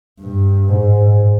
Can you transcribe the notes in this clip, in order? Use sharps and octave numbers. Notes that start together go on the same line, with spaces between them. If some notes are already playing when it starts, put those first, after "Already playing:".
G2
G#2